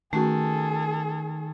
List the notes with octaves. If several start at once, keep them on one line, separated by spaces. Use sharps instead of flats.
D#3 A3 C#4 F#4 G#4 A4